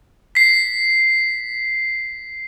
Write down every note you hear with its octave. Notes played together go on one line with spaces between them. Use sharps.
B6 C7